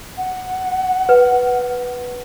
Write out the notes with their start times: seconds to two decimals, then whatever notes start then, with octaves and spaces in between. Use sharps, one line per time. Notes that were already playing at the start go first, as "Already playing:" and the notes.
0.17 F#5
1.09 B4